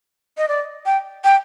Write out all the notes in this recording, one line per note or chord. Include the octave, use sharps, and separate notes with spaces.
D#5
D5
G5
G5